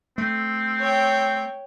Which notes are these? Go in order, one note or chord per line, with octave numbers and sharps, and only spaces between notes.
A3 C4
C#5 G5